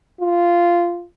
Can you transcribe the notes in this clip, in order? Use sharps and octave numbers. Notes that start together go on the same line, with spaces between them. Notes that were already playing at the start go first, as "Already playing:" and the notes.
F4